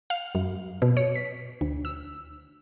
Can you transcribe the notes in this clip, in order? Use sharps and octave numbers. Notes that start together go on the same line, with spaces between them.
F5
F#2
B2
C#5
B6
D2
E6